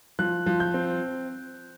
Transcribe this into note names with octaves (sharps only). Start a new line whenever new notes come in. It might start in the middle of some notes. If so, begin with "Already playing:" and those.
F3 F#6
F3
G6
C4